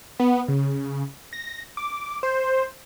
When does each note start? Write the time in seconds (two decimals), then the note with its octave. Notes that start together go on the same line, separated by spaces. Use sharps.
0.20 B3
0.48 C#3
1.33 A#6
1.77 D6
2.23 C5